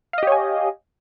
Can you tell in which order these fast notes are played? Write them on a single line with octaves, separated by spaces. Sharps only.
F5 D#5 G4 C#5 G#5